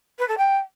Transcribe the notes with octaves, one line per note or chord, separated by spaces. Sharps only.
B4
A4
G5